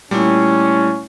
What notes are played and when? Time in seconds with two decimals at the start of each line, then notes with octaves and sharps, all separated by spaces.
0.11 A#2 G3 A3 C#4 E4